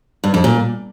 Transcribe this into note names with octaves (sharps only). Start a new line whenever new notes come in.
G2
F2
A#2